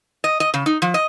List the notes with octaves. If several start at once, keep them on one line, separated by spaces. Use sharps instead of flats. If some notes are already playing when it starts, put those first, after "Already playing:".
D#5
D#5
C#3
D#4
F3
D#5